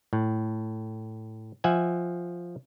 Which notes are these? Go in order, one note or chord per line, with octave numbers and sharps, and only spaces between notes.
A2
F3 E5 F#5 G#5